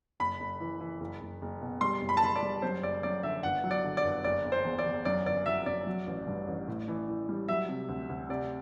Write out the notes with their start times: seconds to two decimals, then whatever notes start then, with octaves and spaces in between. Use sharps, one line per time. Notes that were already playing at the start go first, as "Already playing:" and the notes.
0.20 F#1 B5
0.40 F#1
0.60 E3
0.80 E3
1.00 F#1
1.21 F#1
1.42 F#1
1.61 B2
1.81 G3 C6
2.01 F#1
2.09 B5
2.17 A5
2.22 F#1 B5
2.35 D5
2.43 G3
2.62 F#2 C5
2.83 F#1 D5
3.03 F#2 D5
3.23 D3 E5
3.43 G1 F#5
3.64 F#3
3.71 D5
3.84 D3
3.97 D5
4.04 G1
4.24 F#1 D5
4.45 F#1
4.52 C5
4.64 E2
4.78 D5
4.85 E2
5.05 F#2 D5
5.25 G1 D5
5.46 F#3 E5
5.66 F#2 D5
5.87 F#3
6.07 A1
6.27 G2
6.48 A1
6.68 A2
6.88 E3
7.08 E3
7.29 G3
7.48 F#3 E5
7.69 C3
7.88 D2
8.09 D2
8.29 C3 D5